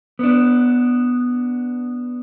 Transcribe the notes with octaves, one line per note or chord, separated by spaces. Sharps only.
B3 D4